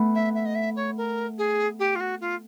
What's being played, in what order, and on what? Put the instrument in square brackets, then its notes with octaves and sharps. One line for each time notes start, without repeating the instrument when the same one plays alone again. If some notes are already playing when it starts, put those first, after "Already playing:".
Already playing: [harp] A3 B3
[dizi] E5
E5
D#5
E5
C#5
A#4
G#4
G4
F4
F#4
F4